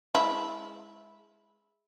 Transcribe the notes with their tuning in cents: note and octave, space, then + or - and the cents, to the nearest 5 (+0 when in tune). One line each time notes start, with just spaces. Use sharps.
G#3 +0 E4 -10